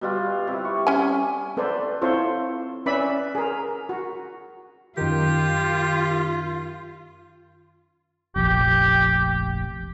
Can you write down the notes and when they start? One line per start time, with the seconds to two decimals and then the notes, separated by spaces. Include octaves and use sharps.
0.01 B2 G3 F4
0.47 C3 E4
0.65 C#6
0.87 C#4 G#5
1.57 B3 A4 B4 C5 D5
2.02 C4 E4 F4 A4 C5 C#5
2.86 C#4 B4 D5 E5 B5
3.35 G#4 A#4
3.89 F#4
4.97 F#2 D#3 F4 G4
8.36 F1 A#1 G4